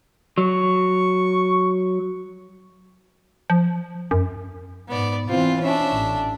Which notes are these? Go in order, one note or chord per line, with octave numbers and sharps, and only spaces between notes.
F#3 C#6
F3
F#2
G#2 B3 D5
E3 C4 F4
C#4 D4 E5
A1